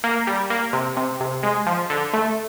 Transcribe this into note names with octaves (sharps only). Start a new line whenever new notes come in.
A#3
G3
A#3
C3
C3
C3
G#3
F3
D3
A3